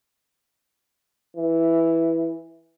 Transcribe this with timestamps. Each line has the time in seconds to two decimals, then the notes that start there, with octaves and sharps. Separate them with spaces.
1.37 E3